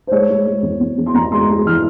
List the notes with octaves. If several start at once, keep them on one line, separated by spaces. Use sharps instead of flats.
C5
G#3 C#5
G#3
G#3
E2
E2
E2
C6
E2 A#5
G#3 C6
G#3
E3 F6